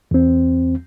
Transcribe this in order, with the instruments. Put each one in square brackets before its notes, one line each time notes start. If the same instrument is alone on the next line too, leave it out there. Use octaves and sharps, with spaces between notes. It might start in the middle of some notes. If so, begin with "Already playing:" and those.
[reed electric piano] E2 C4